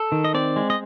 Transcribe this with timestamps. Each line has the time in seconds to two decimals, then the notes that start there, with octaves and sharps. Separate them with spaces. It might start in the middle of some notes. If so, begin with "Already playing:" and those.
Already playing: A4
0.12 D#3
0.24 D#5
0.34 C4 D5
0.56 G#3
0.70 D#5